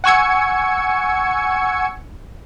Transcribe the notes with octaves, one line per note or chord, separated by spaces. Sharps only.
F#5 G#5 C#6 E6 G#6 C#7